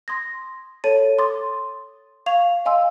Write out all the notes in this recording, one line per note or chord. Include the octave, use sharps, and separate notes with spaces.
C6 D#6 G#6 A#6
A4 C#5 A5 A6 D#7
C6 D6 D#6 A6
F5 C#6 G#6 F7
D#5 F5 G#5 C6 E6